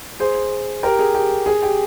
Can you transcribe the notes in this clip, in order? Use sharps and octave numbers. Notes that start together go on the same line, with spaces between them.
G#4 C5
G4 A#4
G#4
G4
G#4
G4